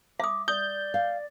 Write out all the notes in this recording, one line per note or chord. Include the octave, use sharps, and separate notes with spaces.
E5 D6 D#6
D5 D#6 G6
F5